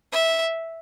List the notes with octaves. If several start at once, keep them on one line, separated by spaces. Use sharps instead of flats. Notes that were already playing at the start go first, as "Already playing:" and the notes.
E5